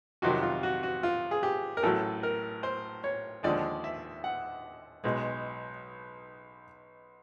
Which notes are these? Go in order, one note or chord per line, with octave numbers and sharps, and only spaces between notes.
F2 C3 D#3 F#3 F#4
F4
F#4
F#4
F4
G#4
G4
A#4
A1 A2 F#3 A4
A#4
C5
C#5
D#2 D3 F3 G#3 D5
E5
F#5
B1 B2 G#3